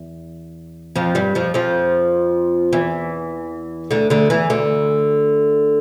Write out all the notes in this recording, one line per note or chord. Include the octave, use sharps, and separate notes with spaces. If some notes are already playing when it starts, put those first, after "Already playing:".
Already playing: E2
F2 F3
G2 G3
F2 F3
F2 F3
E2 E3
D2 D3
D2 D3
E2 E3
D2 D3